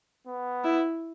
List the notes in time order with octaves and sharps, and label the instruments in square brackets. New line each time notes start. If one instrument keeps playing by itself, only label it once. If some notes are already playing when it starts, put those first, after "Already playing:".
[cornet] B3
[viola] E4